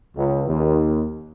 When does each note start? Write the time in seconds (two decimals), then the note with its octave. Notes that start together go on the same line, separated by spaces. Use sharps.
0.16 C#2
0.47 D#2